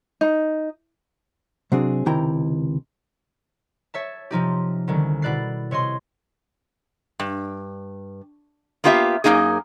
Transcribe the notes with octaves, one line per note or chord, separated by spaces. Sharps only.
D#4
C3 F#3 C4 D4 G#4
C#2 C3 D#3 E4 G5 A#5
C#5 E5 A5
C3 F3 D#4 G4
C2 D3 D#3 C#4
B2 E4 D5 F#6 A6 C7
C3 C#5 D#5 C6
G2
A#3 B3 F4 G4 D#5 E5
F#2 C#3 A#3 D#4 G#4